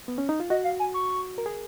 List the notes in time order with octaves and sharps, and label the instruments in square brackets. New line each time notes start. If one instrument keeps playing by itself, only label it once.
[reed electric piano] B3
C#4
D#4
F4
[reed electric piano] F#4 [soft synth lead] D#5
[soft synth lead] F5
G#5
C#6
[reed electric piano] A#4
G#4